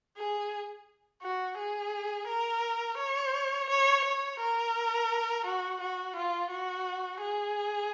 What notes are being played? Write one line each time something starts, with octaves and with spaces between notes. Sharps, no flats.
G#4
F#4
G#4
A#4
C#5
C#5
C#5
A#4
F#4
F#4
F4
F#4
G#4